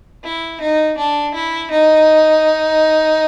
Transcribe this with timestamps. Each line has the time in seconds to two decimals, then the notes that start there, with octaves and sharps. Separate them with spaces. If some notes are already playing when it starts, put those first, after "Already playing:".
0.24 E4
0.61 D#4
0.97 D4
1.34 E4
1.71 D#4